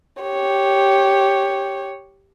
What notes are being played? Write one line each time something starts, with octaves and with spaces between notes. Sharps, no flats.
G4 C#5